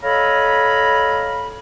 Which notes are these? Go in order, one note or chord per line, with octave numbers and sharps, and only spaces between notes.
A4 C#5 D#5 F5 A#5 B5